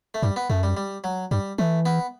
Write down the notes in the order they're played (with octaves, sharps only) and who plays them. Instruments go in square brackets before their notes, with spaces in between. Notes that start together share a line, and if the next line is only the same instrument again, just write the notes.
[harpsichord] A3
[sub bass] G2 [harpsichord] G3
[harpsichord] B3
[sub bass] F#2 [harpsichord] A3
[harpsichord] G3
G3
F#3
[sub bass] G2 [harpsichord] G3
[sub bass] E3 [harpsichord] A3
[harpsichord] B3